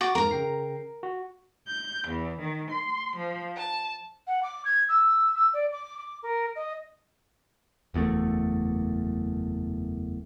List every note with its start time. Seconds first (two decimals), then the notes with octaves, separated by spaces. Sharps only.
0.01 F#4 D6 A6 A#6
0.15 F2 G#2 A#4 A#5
0.31 C#3 G5 C7
1.03 F#4
1.67 G6
2.08 E2
2.39 D#3
2.71 C6
3.17 F3
3.57 A5
4.27 F#5
4.42 D6
4.65 G#6
4.88 E6
5.35 E6
5.53 D5
5.71 D6
5.97 D6
6.22 A#4
6.55 D#5
7.94 F#1 E2 G#2 A3